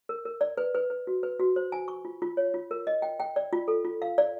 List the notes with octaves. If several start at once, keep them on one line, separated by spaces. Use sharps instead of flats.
A#4
A#4
D5
B4
B4
B4
F#4
B4
F#4
C5
G#5
C#6
F4
F4
C#5
F4
A#4
D#5
G5
G5
D5
F4
A4
F4
F5
D5